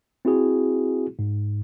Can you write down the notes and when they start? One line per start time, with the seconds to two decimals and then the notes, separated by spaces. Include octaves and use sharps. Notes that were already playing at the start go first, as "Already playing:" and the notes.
0.25 C4 E4 F#4 G#4
1.19 G#2